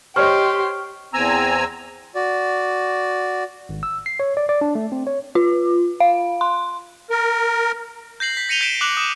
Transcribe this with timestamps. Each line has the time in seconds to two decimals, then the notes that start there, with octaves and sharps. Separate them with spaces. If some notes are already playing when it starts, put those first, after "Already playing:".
0.16 G4 C5 C#5 D#5 C6 C#6 F6
1.14 E2 C4 G#5 A#5 E6
2.15 F#4 D5
3.69 G#1
3.83 E6
4.06 C7
4.20 C#5
4.37 D5
4.49 D5
4.61 D4
4.75 A3
4.92 C4
5.07 C#5
5.35 F4
6.00 F5
6.41 C6
7.10 A#4
8.20 G6 A#6 C7 F#7
8.37 B6
8.49 A#6 C#7 D#7 F7 G7
8.61 G6 B6 D7 E7
8.81 D6 F#6 F7 F#7
8.97 D#6